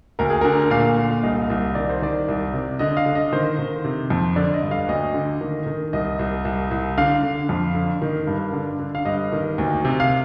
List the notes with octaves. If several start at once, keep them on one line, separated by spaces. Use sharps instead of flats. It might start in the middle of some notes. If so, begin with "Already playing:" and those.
D2 A#4
G#4
D3 A#4
A#2 F5
A#2
F5
C2 D#5
C2
D#3 D5
C5
D#3 D5
C2
C3
D3 D#5
F5
D3
D#5
D#3 C5
D#3
C3
F2
D3 D5
D#5
G2
F5
D2 D#5
D3
D#3
D#3
C2 D#5
C2
C2
C2
D3 F5
D3
F2
D3
D#3
G2
D3
D3
F5
G2 D#5
D#3
D2
C3
F5